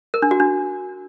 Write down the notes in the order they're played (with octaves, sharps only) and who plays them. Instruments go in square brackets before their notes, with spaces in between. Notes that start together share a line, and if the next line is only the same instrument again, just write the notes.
[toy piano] A#4
D4
F#4
D4